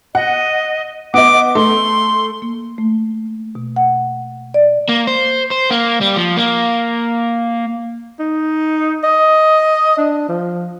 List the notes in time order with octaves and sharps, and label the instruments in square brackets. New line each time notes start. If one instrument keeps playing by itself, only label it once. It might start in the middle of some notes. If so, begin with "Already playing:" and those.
[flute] D#5 [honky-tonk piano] F#5
[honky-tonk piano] B3 D#5 [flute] D6
[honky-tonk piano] A3 [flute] C6
[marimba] A#3
A3
B2
F#5
D5
[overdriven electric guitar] A#3
C5
C5
A#3
G3
F3
A#3
[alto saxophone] D#4
D#5
D4
F3